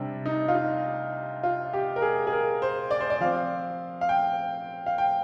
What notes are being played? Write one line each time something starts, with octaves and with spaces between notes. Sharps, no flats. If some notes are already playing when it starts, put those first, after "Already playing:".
Already playing: C3 G3 D4
D#4
F4
D#4
F4
G4
A#4
G#4
G#4
A#4
C5
D5
C5
D5
F3 C4 F5
F5
G5
F5
G5